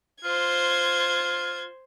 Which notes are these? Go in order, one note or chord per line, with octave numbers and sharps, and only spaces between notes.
F4 C5 G#6